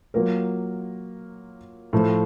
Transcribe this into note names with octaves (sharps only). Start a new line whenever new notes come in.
F#3 A#3 F4 A#4
A2 F3 A3